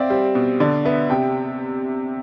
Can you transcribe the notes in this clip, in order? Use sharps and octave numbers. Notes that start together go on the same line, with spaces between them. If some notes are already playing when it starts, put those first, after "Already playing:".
Already playing: C4 D5 E5 F5
G3 C5
B2
D3 D5
B3 E5
C3 G5